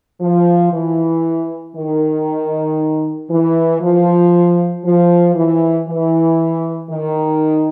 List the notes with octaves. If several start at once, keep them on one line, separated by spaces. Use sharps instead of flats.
F3
E3
D#3
E3
F3
F3
E3
E3
D#3